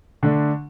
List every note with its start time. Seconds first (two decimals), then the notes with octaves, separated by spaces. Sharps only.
0.23 D3 A3 D4